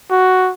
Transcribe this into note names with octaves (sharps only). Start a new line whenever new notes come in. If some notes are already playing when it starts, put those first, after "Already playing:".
F#4